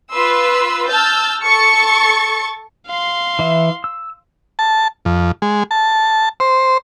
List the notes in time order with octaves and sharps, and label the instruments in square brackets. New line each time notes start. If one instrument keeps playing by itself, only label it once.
[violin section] F4 B4 C6 E6
A5 E6 F6 G6 A6
A4 C#6 A6 C#7
[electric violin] F5 C6
[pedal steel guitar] E3 E5
E6
[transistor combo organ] A5
F2
G#3
A5
C5